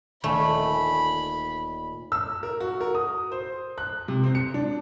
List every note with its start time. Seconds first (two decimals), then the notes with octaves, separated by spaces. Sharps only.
0.24 D#1 A3 G#5 B5
2.12 E6
2.43 A#4
2.60 F#4
2.81 A#4
2.95 D#6
3.32 C5
3.78 F#6
4.08 C3
4.23 C4
4.35 C#7
4.54 D4